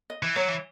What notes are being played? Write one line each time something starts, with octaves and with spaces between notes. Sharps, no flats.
D#5
E3
F#3 C#5
E3